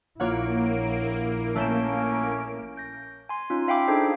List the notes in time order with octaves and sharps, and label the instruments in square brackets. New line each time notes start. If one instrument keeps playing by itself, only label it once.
[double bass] A#1 E4 [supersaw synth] A#3 D7 [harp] F4 C#5 F#5
[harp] A3 G6 E7 [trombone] C#4
[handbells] G6 A#6
G#5 C6
C#4 D#4 F4
E5 F5 G5 B5 D6
D4 D#4 G#4 A4 C5 C7